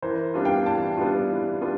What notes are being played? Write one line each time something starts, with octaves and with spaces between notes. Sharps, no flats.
E3 A#4 C5
G3 B3 D4 F4
F5 G5
E3 G5 A5
G3 B3 D4 F4
E3
G3 B3 D4 F4